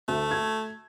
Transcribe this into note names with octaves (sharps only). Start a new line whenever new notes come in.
D2 A3
G#6